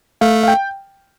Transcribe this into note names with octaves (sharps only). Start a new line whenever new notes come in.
A3 F5
F5
G5